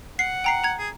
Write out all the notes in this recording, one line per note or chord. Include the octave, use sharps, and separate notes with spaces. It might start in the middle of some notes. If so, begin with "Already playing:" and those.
F#5 C7
G5 A#5 C7
A#5 G#6
G#4